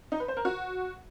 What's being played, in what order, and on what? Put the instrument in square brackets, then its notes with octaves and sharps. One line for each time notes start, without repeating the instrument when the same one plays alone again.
[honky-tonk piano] D#4
B4
C5
A#4
F#4